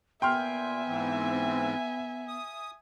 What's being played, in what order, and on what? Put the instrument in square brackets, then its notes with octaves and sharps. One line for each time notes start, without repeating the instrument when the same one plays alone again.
[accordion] A#2 [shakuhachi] B3 [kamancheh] E5 G#5 [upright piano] G5 C6 F6
[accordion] G#2 E3 C4
D#6